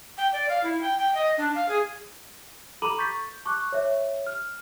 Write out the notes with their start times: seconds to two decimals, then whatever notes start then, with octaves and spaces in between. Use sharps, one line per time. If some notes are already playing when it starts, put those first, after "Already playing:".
0.17 G5
0.33 D5
0.49 F5
0.63 E4
0.81 G5
0.98 G5
1.14 D#5
1.37 D4
1.55 F5
1.69 G#4
2.82 A4 A#5 B5 D6 D#7 F#7
2.98 C#6 G6 A6 B6
3.45 A5 C#6 D6 F#6
3.72 C#5 E5
4.27 F6